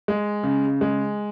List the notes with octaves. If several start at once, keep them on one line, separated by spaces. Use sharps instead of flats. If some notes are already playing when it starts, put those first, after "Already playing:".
G#3
C#3
G#3